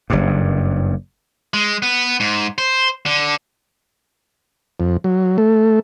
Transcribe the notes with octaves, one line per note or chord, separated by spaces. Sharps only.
F#1 G2
G#3
B3
G#2
C5
D3
F2
F#3
A3